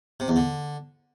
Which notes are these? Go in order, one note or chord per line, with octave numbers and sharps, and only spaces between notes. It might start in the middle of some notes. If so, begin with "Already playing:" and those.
C3
E2
D3